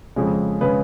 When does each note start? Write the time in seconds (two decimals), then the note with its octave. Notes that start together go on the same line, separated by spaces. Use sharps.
0.16 F2 C#3 G#3
0.61 C#3 G#3 B4